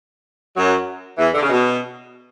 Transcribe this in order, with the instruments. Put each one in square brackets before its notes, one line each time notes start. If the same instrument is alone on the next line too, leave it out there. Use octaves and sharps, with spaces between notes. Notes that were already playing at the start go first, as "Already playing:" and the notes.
[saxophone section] F#2 F#3
E2 E3
D3
C#3
B2